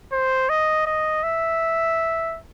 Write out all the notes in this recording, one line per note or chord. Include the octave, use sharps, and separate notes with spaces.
C5
D#5
D#5
E5